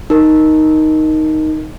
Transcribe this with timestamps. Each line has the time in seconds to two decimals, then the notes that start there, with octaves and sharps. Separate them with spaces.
0.10 D#4 A#4